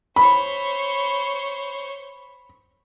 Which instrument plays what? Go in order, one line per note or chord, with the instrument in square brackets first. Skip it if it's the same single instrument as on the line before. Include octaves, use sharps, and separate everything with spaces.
[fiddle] C5 C#5 [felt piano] B5